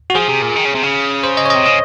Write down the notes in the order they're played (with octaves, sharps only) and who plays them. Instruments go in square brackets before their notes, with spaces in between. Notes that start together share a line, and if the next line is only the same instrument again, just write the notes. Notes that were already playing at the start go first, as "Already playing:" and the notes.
[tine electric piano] F#4
[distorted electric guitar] F3 [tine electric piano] G#4
[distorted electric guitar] C3
A#2
D#3
C#3
C3
C#3
[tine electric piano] C5
D#5
C#5
[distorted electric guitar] C3 [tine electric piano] D#5
[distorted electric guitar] C#3 [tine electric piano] D#5